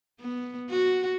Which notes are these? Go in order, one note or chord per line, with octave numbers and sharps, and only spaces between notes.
B3
F#4